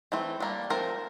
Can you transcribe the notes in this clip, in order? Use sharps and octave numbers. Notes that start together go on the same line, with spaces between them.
E3 A3 C4
G3 A#3 D4
F3 A3 C4 A#4